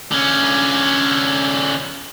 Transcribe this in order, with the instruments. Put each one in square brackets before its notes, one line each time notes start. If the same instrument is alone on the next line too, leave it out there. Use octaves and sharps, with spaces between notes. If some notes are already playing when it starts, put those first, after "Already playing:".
[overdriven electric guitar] D3 C#4